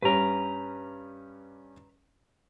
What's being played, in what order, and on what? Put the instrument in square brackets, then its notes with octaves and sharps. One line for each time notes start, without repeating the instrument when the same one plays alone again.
[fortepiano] G2 G3 C#4 [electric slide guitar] B4 A#5